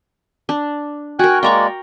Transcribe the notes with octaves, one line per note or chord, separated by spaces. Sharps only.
D4
F#4 A#4 G5 G#5 F#6
G#3 A#3 D5 G5 A#5 C#6